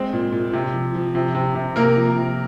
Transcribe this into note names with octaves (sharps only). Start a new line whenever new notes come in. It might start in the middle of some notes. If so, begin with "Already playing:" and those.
Already playing: G#3 C4 C5
A#2
A#2
C3
F3
F3
C3
C3
C3
C3 A#3 A#4
F3
C3